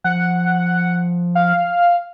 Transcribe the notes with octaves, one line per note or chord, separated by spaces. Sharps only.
F3 F#5
F5